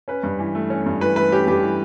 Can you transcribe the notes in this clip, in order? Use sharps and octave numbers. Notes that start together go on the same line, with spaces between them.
C#4 B4
G2
E3
A3
C#4
G2
E3 B4
A3 B4
C#4 G4
G2 G4
E3